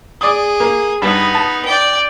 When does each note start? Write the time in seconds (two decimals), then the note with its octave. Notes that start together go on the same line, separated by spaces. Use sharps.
0.21 G#4 D5 D#6
0.60 A#3
1.02 G2 B3 D#4 B5
1.35 A5
1.66 D5 G5